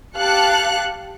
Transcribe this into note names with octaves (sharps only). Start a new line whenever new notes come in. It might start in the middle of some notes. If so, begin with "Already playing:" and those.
G4 F5 A5 F#6 C#7